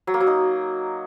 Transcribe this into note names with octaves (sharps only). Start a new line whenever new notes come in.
F#3
A#3
F#3
D#4